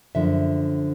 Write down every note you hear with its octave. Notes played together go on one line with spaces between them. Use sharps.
F#2 D3 F3 E5